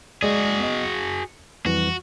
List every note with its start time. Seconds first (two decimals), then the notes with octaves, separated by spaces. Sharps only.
0.22 G#3 F#4 G#4 D5
0.60 B3 D#5
0.84 C#7
1.66 F2 E3 G3 F#4